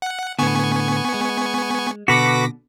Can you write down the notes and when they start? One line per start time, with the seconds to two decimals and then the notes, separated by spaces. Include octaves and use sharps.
0.02 F#5
0.39 A2 D3 B3 G#5 C#6
1.14 G#3
2.08 B2 D3 F#4 A4 B4 D6 A#6 B6